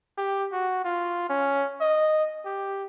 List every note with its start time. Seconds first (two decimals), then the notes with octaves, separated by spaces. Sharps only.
0.18 G4
0.52 F#4
0.85 F4
1.29 C#4
1.81 D#5
2.45 G4